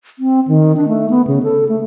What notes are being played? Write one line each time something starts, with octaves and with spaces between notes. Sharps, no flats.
C4
D#3
D4
A3
B3
C#3
A4
A3